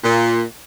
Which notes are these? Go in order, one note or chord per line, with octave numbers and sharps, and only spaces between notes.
A#2